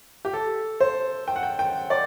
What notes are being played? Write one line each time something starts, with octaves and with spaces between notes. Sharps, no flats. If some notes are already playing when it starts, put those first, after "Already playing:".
G4
A4
C5
G5
F#5
G5
G5
D5